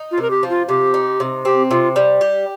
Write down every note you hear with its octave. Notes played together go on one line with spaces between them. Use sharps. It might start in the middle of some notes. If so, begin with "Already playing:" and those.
Already playing: D#4
F4
C3 A#4
G4
F3
F4
C3 G4
D#4
C3
C4 G4
C3 F4
G3
G4